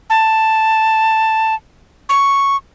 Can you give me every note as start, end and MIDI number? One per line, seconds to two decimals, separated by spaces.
0.10 1.54 81
2.09 2.56 85